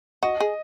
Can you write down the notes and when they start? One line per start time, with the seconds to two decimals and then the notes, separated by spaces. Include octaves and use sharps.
0.23 F#4 D#5
0.40 G#4